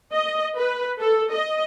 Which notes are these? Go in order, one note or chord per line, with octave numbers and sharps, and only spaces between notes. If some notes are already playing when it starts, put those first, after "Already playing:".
D#5
B4
A4
D#5